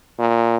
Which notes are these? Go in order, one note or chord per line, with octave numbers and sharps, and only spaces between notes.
A#2